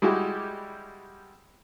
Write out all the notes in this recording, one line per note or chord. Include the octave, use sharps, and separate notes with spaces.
G3 G#3 E4 F#4 G4